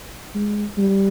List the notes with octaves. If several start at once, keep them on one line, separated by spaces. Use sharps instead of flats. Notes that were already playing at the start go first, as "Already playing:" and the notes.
G#3
G3